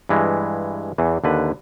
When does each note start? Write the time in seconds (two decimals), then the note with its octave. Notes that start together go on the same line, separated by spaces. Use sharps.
0.09 G2 E3 G#3
0.98 E2 E3
1.24 D#2 D3 B4